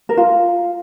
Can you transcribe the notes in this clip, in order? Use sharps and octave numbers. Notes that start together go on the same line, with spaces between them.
A#4
F4